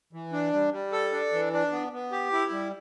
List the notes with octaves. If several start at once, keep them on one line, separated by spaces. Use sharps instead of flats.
E3
D4
G3
G3
A4
D4
E3
D4
B3
B3
G4
E4
G3